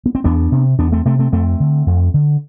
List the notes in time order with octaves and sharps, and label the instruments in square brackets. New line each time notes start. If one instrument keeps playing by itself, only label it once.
[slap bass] B3
C4
E2 B3 D4
C3
E2 B3 D4
A3 C4
C3 A3 C4
A3 C4
F2 A3 C4
D3
F2
D3